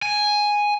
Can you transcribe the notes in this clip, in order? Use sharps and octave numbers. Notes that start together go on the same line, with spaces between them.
G#5